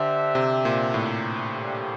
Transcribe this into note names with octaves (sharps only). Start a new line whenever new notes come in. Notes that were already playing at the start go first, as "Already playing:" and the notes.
Already playing: D3 D4 G4 C5 E5 G5
C3
A#2
A2
G3 A#3 D4 G4